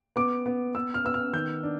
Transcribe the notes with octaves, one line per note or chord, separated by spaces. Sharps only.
B3 D6
B3
B3 E6
F6
B3 E6
F6
D#3 G6
D4